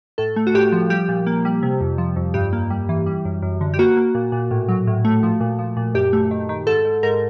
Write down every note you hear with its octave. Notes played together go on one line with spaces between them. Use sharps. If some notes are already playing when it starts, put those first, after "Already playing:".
A2 A4
A3
F#4
A2 G4
F3
G3 G4
A#2
A#3
G3
C3
F2
F3
F2
G2 G4
A#3
G3
E3
G3
F#2
F#2
D3
G4
A#3 F#4
A#3
A#2
A#2
A2
F#3
A2
A3
F3
A#2
F3
A#2
F#2 G4
A3
D#3
D#3
G#2 A4
G#2
G#2 A#4